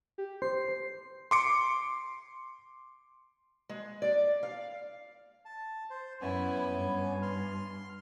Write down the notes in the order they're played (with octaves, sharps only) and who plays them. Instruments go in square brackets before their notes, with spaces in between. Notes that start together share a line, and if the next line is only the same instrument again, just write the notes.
[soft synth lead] G4
[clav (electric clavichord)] C5 [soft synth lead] C7
[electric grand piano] C6 D6 C#7
[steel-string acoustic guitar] G#3
D5
F5
[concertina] A5
C5
[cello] F#2 E4 [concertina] B3 C#4 G#5
[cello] G2
[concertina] C6 F6